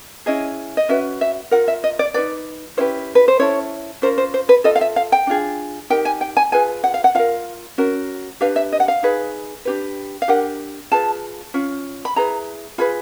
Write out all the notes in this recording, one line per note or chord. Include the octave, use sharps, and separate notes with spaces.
C#4 E4 G#4 D#5
D#5
C#4 F#4 B4 E5
E5
F4 A#4 F#5
E5
D#5
D5
D#4 G#4 B4 D5
C#4 E4 G4 B4 C5
B4
C5
C#4 E4 A4 C#5
C#4 F4 A#4 C5
C5
C5
B4
F4 A4 D#5
F5
E5
F5
G5
D4 F4 G#4
D#4 G4 A#4 G5
G#5
G5
G#5
F4 G#4 B4 G#5
F#5
F5
F#5
F4 A#4 F5
C#4 F#4 A#4
D4 G4 B4 F5
E5
D#5
F#5
F5
D#4 G#4 B4
D4 G4 B4
F5
D4 G4 A#4 F#5
F4 G#4 B4 A5
C#4 F4
B5
E4 G#4 B4 A#5
F4 G#4 B4 B5